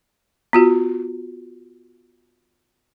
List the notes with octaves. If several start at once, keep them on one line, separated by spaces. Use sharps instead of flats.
B3 F4 F#4